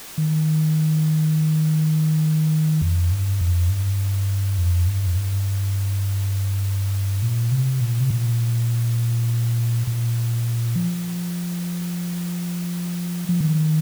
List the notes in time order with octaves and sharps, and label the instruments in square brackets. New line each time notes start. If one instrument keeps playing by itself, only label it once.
[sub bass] D#3
F2
G2
F2
G2
F2
G2
F2
G2
A#2
C3
A#2
C3
A#2
A#2
F3
F3
D#3